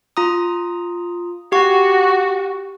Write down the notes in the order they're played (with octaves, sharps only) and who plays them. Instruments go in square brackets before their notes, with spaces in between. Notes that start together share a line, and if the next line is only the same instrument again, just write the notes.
[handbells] F4 A#5 D#6
[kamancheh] F#4 [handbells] G4 C#6